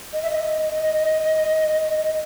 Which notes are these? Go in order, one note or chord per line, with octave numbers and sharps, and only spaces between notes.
D#5
E5
D#5